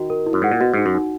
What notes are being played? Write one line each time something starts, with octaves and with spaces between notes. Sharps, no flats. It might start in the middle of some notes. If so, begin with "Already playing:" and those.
Already playing: D#3 F#4
A#4
E4
F#2
G#2 F#5
A#2
B2 F#4
G#2 D#4
F#2
D#4